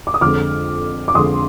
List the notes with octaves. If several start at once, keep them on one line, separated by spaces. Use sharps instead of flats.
D6
D#6
F2 D3 G#3 D6 F6
D6
F2 D3 G#3 C6 D#6